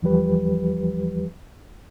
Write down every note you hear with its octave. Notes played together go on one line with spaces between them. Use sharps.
E2 E3 F3 G3 G4 B4